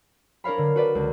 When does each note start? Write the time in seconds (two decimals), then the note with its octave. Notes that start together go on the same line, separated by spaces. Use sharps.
0.44 D4 A#4 C#5 F5 B5
0.58 D3
0.76 F#4 B4 D5
0.95 C#2